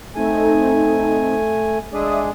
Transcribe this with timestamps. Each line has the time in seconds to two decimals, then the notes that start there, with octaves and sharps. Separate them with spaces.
0.15 A3 C4 D#4 A4 G#5
1.93 G#3 D4 G#4 D5 E5 D#6